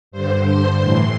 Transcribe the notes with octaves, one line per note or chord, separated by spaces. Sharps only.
G2 D3 C5
C6
A2 E3 C6